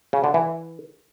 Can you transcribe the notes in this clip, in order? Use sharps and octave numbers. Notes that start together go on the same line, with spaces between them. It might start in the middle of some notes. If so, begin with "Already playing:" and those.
C#3
D3
E3